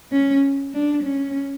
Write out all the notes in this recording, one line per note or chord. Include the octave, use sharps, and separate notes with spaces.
C#4
D4
C#4